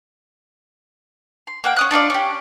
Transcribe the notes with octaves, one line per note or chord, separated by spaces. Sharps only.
C6
A#3 F#5 G5
C#4 D#6 F#6
D4 D#4 F4 D5
C#4 G4